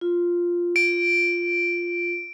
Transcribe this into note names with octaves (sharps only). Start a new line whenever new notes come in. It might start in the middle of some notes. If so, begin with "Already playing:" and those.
F4
D7